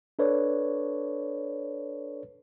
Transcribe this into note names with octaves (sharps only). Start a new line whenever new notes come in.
D4 A4 B4 C#5 D5